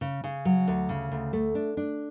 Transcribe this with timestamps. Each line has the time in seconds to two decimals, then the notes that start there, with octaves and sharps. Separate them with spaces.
0.01 C#3
0.24 C#3
0.45 F#3
0.68 D2
0.89 C#3
1.12 D2
1.33 A3
1.55 D4
1.77 D4